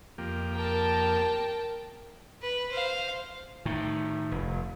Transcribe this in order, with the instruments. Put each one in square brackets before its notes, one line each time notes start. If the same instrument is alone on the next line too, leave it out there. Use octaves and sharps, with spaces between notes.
[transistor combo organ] F2 A#3 G4
[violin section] A#4 G5 A5
[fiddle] B4
C5 F5
[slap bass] A2 D#3
F1